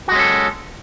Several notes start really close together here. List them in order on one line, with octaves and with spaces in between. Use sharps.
F#4 G#3 C#4 A4